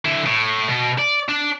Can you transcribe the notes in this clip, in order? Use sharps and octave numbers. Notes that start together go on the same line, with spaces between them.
D3 E4
A2
B2
D5
D4